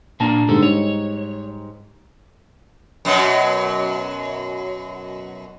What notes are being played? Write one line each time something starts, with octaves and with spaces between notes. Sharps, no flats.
A#2 A#3 D4 A5 A#5
G#2 D3 G3 D#4 A4
C#5
F#2 B2 F#3